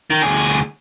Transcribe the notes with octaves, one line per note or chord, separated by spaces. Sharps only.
D#3
D2 G#4